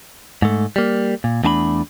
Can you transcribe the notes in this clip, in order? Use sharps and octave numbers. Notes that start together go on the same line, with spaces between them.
G#2 A3
G3 A#3
A#2
E2 A3 D4 A5 B5